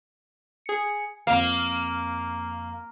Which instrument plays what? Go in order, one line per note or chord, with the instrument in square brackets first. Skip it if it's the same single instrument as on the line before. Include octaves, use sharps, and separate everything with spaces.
[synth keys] G#4 C#7
[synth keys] F2 F5 [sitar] A#3